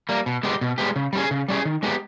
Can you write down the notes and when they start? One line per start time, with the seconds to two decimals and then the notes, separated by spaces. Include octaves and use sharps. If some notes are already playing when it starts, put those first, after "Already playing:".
0.09 G3 A#3
0.26 B2
0.43 G#3 B3 G4
0.61 B2
0.78 G#3 B3 G4
0.96 C#3
1.13 G3 C#4 G#4
1.31 C#3
1.48 G3 C#4 G#4
1.65 D#3
1.83 G#3 B3 G4